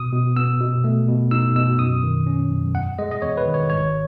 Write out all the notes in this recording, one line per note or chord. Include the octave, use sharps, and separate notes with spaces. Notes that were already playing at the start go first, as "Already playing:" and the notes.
Already playing: B2 D#6
B2
B3 E6
B2
A3
B2
D#4 E6
B2 E6
F#2 D#6
D#3
C#4
F#2
E2 F#5
G#3 D#5
D#5
E2 C#5
B4
D#3
C#5
G#1 C#5